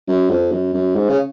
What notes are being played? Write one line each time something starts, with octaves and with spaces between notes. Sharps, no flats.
F#2
F2
F#2
F#2
G#2
C#3